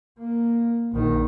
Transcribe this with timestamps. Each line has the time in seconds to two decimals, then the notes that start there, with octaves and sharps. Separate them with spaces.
0.19 A#3
0.92 A#1 D#3